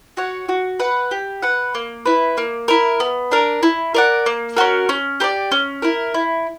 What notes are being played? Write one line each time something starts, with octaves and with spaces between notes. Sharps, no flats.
F#4 C#5 F#5
F#4
B4 F#5
G4
B4 F#5
A#3
E4 B4
A#3
E4 A#4
B3
D4 A#4
E4
A#4 D5 F#5
A#3
C#4 F#4 A#4
C#4
G4 A#4 D5
C#4
E4 A#4
E4